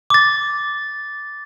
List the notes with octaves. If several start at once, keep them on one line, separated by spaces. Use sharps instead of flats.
D6 A6